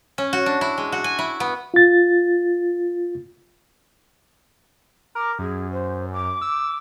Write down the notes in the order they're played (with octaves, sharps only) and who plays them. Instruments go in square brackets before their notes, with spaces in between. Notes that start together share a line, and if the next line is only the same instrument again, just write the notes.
[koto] C#4
F#4
D4
E4
G#3
F#4
G#5
E4
B3
[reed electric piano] F4 A6
[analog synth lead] A#4 [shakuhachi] D6
[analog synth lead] F#2 [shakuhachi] G#4
[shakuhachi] C5
D6
[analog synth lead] E6